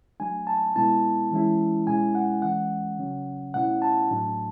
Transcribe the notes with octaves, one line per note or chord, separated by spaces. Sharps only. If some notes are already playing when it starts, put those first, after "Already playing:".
F#3 A3 D4 G#5
A5
B2 G#3 B3 E4 A5
E3 G#3 C#4 E4
B2 G#3 C#4 E4 G#5
F#5
E3 G#3 C#4 F#5
C#3 F#3 C#4
B2 A3 C#4 E4 F#5
A5
A2 F#3 A3 D4